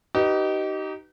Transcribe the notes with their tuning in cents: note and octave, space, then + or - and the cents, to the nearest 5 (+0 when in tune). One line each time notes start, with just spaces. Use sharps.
D#4 +0 G4 -35 B4 +0